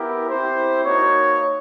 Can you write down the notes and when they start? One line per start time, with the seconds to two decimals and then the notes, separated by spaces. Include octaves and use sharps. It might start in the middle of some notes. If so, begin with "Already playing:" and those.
Already playing: B3 E4 G4 A#4
0.29 C4 E4 G4 C5
0.84 A#3 D#4 F#4 C#5